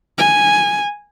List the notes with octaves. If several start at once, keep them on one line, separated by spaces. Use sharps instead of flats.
G#5